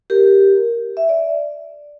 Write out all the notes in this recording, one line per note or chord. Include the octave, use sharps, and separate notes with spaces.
G4 A#4
E5
D5